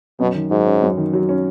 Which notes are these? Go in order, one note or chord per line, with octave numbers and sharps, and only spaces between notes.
F#2 B2
D#3
G#2 F#3
C#4
F#2
D#3
F#3
C#4